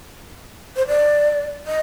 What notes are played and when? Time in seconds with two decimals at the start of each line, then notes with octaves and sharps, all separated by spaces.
0.76 C5
0.87 D5
1.67 D#5